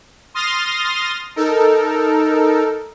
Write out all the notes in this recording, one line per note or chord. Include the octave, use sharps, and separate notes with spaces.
C6 D#6 F6 A6 A#6
D#4 A4 A#4